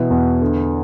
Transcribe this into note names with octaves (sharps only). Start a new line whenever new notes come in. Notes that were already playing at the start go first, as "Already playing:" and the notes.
Already playing: B2 E3
E2
D3